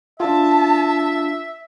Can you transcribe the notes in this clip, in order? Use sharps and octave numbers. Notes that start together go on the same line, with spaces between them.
D4 F4 E5 A5